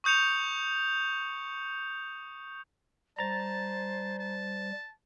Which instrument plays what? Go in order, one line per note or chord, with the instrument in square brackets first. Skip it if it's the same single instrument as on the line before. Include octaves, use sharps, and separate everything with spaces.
[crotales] C#6 D#6 G6 C#7 F7
[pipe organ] G3 [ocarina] C5 [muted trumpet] A5 [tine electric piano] A#5 A6
[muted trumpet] A5